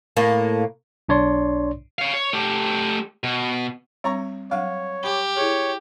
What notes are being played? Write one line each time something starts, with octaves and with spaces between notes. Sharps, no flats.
A2 A#3
B1 D4 C#5 D5 C6
C#5 F5
C#5
A3 G4
B2
G3 C4 C#5 A#5 C#6
F#3 C#5 F5 F#5
G4 B5 D6
E4 G#4 C#5